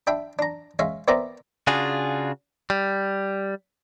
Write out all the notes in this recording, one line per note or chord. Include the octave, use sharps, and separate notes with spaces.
D4 E5 G5 B5
D4 A#5
G#3 C#4 E5 F5
B3 C4 A#4 D5 E5 A#5
C#3 D4 F4 F#4 G#4
G3